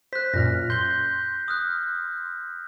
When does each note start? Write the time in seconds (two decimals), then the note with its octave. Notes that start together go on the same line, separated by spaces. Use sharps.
0.13 C5 F#6 B6
0.34 F#2 A#2 F6 A#6
0.70 C6 G6 G7
1.48 D#6 F6 F#6